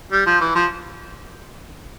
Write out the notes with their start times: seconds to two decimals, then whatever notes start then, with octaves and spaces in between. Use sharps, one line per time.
0.12 G3
0.26 F3
0.41 E3
0.55 F3